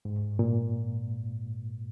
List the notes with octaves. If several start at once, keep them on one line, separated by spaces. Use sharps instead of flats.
G#2
A#2